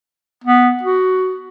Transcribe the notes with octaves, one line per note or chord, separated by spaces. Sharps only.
B3
F#4